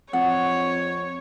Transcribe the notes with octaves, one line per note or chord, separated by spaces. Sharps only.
F2 C#5 F#5